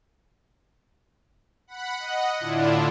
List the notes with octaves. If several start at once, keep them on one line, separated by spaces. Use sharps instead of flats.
F#5 B5
D#5 F#5
A2 D3 D4 E4 F4